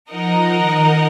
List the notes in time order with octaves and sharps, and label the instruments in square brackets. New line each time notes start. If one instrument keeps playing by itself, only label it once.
[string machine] F3 [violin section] D#4 A#4 D#5 F#5
[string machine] D#3